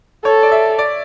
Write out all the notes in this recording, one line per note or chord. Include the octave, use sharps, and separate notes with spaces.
A4 C#5
D5
E5
D5